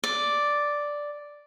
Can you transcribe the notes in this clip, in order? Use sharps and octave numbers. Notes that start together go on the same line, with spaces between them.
D5